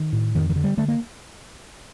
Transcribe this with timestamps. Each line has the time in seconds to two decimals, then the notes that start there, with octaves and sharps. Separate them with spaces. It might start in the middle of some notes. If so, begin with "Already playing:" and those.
Already playing: D#3
0.13 A2
0.35 F2 D#3
0.50 D#3
0.56 D3
0.64 G3
0.77 D3 A3
0.88 A#3